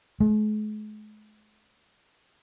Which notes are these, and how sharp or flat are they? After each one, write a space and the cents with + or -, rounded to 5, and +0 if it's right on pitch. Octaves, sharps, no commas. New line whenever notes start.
G#3 +45